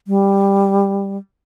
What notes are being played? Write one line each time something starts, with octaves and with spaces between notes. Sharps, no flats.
G3